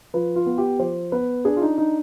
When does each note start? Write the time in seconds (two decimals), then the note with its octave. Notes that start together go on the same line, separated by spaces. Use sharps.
0.14 F3 B4
0.36 F4
0.46 B3
0.58 G4
0.79 F3 C5
1.12 B3 B4
1.45 D4 G#4
1.57 F4
1.62 D#4
1.78 D4 D#4